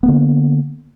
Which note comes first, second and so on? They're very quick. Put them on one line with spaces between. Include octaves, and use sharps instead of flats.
B3 A#3 D3